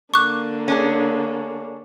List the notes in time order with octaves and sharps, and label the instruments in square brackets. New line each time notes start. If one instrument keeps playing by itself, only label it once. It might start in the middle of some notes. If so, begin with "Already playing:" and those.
[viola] D3 A#3 [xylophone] C#6 D6 F#6
[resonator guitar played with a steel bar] C#4 D4 G#4